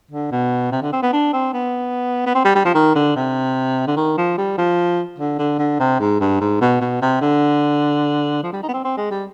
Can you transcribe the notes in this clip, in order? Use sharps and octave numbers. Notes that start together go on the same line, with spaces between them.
D3
B2
C3
D3
C4
B3
D4
C4
B3
B3
C4
G3
G3
F3
D#3
D3
C3
D3
D#3
F3
G3
F3
D3
D3
D3
C3
G#2
G2
G#2
B2
B2
C3
D3
F3
G3
D#4
B3
C4
C4
G#3
G3